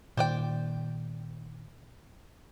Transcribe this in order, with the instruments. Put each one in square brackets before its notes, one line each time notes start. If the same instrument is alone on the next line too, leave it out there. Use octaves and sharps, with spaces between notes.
[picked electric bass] A#2 D#3 [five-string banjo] C5 D5 G5